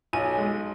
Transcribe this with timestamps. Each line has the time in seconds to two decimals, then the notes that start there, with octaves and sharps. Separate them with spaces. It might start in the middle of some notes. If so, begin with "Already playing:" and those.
0.13 B1 G#5
0.38 G#3